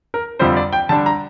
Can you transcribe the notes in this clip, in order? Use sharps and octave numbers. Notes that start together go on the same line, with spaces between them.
A#4
F2 D3 G3 C4 F4 C5
D5
G5
D3 G3 D4 A5
A#5